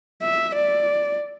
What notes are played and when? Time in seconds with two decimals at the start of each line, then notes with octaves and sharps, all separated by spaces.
0.22 E5
0.55 D5